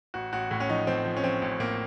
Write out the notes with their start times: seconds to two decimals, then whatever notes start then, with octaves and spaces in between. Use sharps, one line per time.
0.14 A1 F#4
0.33 A1 F#4
0.51 A2
0.60 C#4
0.69 F3 D#4
0.87 F3 C4
1.05 F3
1.17 C#4
1.24 F3 C4
1.42 A1
1.60 A2 A#3